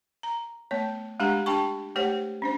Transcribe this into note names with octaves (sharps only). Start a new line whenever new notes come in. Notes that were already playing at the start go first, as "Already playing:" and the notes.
A#5
A3 B3 C#5
G#3 D4 G4 F#5 A#5
D4 G4 G5 A5 C#6
A3 G4 C5 C#5 F#5
C#4 D4 C5